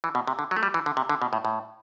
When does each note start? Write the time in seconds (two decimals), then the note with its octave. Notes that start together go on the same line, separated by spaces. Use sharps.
0.04 E3
0.15 B2
0.27 C3
0.39 D3
0.51 F#3
0.56 A3
0.63 G3
0.74 E3
0.86 D3
0.97 C3
1.09 D3
1.22 B2
1.33 A2
1.45 A2